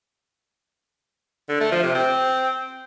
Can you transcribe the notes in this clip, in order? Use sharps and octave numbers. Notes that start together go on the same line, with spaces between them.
D3
A3
F3
C3
C4